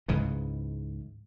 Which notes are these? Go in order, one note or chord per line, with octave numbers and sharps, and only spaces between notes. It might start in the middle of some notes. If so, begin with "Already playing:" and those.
C#2 G#2 C#3 E3